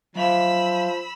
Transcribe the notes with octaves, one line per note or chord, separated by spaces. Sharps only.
F3 F#3 E5 F5 B5 E6